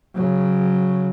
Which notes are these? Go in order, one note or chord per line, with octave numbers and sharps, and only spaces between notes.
C#3 F#3